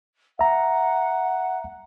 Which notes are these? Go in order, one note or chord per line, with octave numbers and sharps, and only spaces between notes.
E5 F#5 A#5